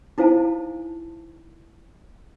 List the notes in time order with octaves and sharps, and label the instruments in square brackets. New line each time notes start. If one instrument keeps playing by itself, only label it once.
[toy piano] D#4 E4 C5 F5 G#5 A5